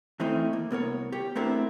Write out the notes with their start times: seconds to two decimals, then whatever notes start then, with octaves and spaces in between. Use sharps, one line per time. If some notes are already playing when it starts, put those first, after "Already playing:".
0.20 E3 A3 C4 C#4 D#4 E4
0.53 A#3
0.71 C2 B3 A#4 C#5
1.12 G4 C#5
1.35 A3 B3 C4 D4 E4 A#4